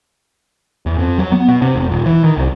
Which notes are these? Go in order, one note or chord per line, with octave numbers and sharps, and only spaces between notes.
E2
F2
F#3
B3
B2
C3
F1
D#1
E3
D#3
C2